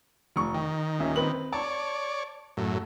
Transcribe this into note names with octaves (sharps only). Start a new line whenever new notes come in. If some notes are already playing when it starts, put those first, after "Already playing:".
F1 C#6
D#3 G5
D#1 C#4 E5
C4 B4 F#7
C#5 D5 A5
F#2 A2